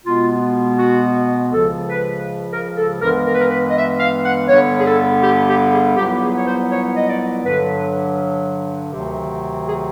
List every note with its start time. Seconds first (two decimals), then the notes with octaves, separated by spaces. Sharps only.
0.04 B2 G#3 B3 F4
0.78 F#4
1.52 C#2 C#3 F3 A4
1.89 B4
2.51 A#4
2.76 A4
3.00 G2 E3 G#3 B3 A#4
3.25 A#4
3.33 B4
3.40 A#4
3.50 B4
3.68 D#5
3.74 E5
3.98 F5
4.24 F#5
4.48 G2 D3 G3 B3 C#5
4.78 G#4
4.85 A4
5.22 G4
5.47 G4
5.72 G#4
5.96 C2 A#2 F#3 B3 G4
6.20 G#4
6.36 C#5
6.45 C5
6.70 C#5
6.95 D#5
7.07 D5
7.44 G2 D3 F#3 B4
8.93 D2 C3 D#3 F#3
9.66 G#4